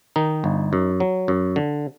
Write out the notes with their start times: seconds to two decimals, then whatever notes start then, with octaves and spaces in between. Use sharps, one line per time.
0.16 D#3 D#4
0.44 G1
0.73 F#2
1.00 F#3
1.28 F#2
1.56 D3